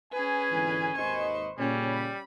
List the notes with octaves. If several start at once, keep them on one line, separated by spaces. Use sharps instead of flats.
C#4 G#4 B4 G#5
G#1 D3 E3
G#1 D#2 B4 C5 D#5 C#6
A#2 C#3 G3 C#4
B5